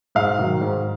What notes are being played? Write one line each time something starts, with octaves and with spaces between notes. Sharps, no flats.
G#2 F5
D#3 F#3
G#2